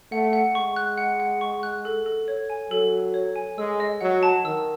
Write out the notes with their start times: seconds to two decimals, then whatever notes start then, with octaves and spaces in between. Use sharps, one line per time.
0.12 A3 F#5
0.33 F#5
0.55 G#3 C#6
0.76 F#6
0.98 F#5
1.20 F#5
1.41 C#6
1.63 F#6
1.85 A4
2.06 A4
2.28 C#5
2.50 G#5
2.71 F#3 A4
2.93 A4
3.14 C#5
3.36 G#5
3.58 G#3 E6
3.80 D#5
4.01 F#3 F#5
4.23 A5
4.45 D#3 E6